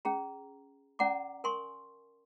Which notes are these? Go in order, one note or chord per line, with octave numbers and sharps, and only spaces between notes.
C#4 G#4 A#5
C#4 D5 F#5 A#5 D6
A#4 G#5 C6 C#6